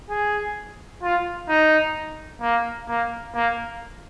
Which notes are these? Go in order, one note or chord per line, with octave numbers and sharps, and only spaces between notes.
G#4
F4
D#4
A#3
A#3
A#3